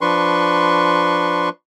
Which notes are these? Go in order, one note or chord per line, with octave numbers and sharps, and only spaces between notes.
F3 D4 B4 C6 C#6